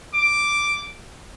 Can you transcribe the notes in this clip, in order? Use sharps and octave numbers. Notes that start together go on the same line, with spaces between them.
D6